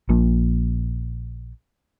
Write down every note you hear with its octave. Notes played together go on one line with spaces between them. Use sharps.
A#1 A#2